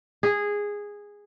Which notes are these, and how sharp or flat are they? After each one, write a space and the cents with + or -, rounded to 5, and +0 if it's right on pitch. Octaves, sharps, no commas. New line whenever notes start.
G#4 -10